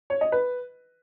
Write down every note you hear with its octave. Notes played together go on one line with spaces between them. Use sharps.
C#5
D#5
B4